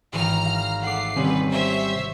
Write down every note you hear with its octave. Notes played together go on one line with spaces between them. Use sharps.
G#1 E3 G5 A#5 F6
F5
A3 F#5 D6 C7
C3 D#3 G3 C#4 B4
C5 C#5 E5